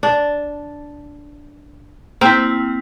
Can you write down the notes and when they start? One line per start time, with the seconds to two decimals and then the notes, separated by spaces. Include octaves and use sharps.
0.03 D4
2.21 A#3 C4 E4